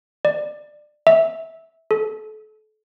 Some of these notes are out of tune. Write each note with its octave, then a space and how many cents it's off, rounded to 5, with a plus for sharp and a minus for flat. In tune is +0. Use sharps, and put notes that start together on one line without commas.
D5 +20
E5 -15
A4 -30